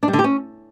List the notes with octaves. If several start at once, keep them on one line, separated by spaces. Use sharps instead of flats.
D4
G3
D3
G4
C#4